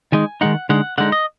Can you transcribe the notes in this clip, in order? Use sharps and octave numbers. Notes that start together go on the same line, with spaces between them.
D#3 G#3 D#4 G#5
D#3 G#3 D#4 F#5
D3 G#3 D#4 F#5
D3 G#3 D#4 F#5
D#5